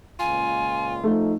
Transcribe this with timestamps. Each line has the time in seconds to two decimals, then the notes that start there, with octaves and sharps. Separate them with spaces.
0.19 C#2 A#2 F4 G#5
1.04 F3 A3 D#4